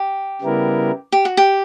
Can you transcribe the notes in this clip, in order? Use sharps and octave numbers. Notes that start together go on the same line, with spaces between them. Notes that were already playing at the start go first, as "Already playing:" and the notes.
Already playing: G4
C#3 G3 B3 E4 A#4
G4
F#4
G4